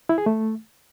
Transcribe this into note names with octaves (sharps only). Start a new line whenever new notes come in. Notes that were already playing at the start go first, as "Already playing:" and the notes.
E4
G#4
A3